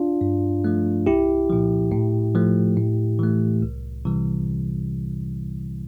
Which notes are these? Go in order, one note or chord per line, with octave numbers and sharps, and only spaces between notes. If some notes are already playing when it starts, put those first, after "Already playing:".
Already playing: D4 F4
G2
F3 A3
C2 E4 G4
A#2 F3
A2
F3 A3
A2
E3 A3
C2
C3 E3 G3